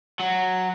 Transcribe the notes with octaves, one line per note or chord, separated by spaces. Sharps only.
F#3